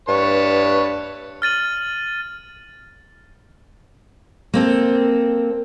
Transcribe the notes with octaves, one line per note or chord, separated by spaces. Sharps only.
G2 B4 C#5 A5
F6 A6 D#7 F#7
A#3 C4 A4